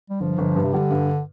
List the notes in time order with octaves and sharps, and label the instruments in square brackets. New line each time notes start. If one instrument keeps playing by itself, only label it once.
[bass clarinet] G3
[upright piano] G1 [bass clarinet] F3
[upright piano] G1
G2
[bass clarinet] C3
[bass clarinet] D3 [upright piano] G3
[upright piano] G2